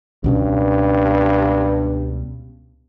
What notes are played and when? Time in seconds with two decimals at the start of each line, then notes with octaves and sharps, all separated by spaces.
0.24 C#2 G2 B2 C#4